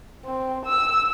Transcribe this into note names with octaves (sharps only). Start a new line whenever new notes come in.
C4
E6